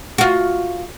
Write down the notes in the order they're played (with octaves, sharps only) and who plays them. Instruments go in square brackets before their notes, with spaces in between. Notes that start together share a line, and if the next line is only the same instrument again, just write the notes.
[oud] F4 F#4